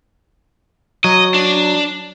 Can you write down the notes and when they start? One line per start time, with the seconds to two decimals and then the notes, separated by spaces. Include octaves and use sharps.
1.04 F#3 D#5
1.34 D4